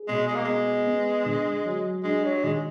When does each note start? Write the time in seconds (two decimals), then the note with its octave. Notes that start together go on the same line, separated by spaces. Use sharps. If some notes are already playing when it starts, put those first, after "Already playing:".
Already playing: G#4
0.08 B2 G#3
0.27 G#3
0.36 A#3
0.44 G#3 B3
0.87 B3
1.26 D3
1.65 F#3
2.04 G#3 D4
2.24 F#3
2.43 D#3 G#3